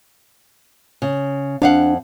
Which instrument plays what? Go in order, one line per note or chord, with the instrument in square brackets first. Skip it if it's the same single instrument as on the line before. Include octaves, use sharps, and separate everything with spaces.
[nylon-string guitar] C#3
[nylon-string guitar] F2 F5 F#5 [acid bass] D4